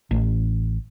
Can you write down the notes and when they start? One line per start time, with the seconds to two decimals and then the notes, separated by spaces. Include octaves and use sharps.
0.11 A1